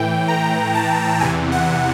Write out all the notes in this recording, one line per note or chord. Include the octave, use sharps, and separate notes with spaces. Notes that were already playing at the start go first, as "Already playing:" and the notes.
Already playing: A2 E3 G5
A#5
A5
E2 C3 E3 G#5
F#5